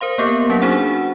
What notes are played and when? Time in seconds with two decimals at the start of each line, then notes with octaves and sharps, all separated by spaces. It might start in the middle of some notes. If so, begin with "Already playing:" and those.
0.01 A#4 C5 F5 C6
0.18 A#3 B3 G4 A#4
0.49 F#3 C#4 F5 B6
0.62 D4 D#4 F#4 G#4 C5 F#5